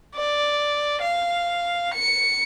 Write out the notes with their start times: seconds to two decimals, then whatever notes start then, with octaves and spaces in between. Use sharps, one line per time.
0.15 D5
1.01 F5
1.93 C#7